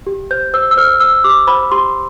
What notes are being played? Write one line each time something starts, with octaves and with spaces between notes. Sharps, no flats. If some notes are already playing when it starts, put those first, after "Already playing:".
G4
C5 G6
C5 E6
E6
C5 F6
C5 E6
G4 D6
C5 B5
G4 C6